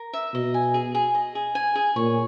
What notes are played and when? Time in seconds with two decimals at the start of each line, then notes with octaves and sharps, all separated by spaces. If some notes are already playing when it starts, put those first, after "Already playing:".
Already playing: A#4
0.14 E5
0.34 B2 D#5
0.54 G#5
0.74 G#4
0.95 G#4
1.15 D#5
1.35 G#4
1.55 G#5
1.75 G#4
1.96 A#2 C#5